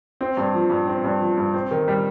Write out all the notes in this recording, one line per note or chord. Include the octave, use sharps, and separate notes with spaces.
C4
G2
F3
G2
C4
G2
F3
G2
C4
D#3
G3